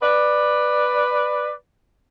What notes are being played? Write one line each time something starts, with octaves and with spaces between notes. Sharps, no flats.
B4 D5